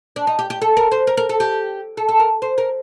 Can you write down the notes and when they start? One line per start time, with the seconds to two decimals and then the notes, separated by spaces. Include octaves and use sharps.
0.16 D4
0.27 D#4
0.39 G4
0.50 G4
0.62 A4
0.77 A#4
0.91 C5
1.07 A#4
1.17 A#4
1.29 A4
1.40 G4
1.97 A4
2.09 A4
2.20 A#4
2.42 C5
2.58 A#4